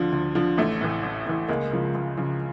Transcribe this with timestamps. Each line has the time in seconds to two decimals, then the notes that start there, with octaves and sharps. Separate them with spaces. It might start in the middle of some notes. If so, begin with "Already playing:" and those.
Already playing: D2 D3 F3
0.12 D2
0.35 D3 F3
0.57 A1 A3
0.81 A2 E3
1.03 A1
1.26 A2 E3
1.49 C#2 G#3 A#3
1.71 C#3 F3
1.95 C#2
2.17 C#3 F3